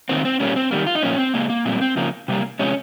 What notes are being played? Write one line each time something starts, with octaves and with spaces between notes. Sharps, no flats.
D#3 A#3 C4
C4
A#2 G3 A#3 C#4
C4
D#3 G3 A#3
F4
D#4
A#2 F3 A#3 C#4
C4
C#3 G#3 A#3
A#3
A#2 G3 A#3 C4
C4
C#3 F3 A#3
C3 G3 A#3
C3 F3 G#3 C#4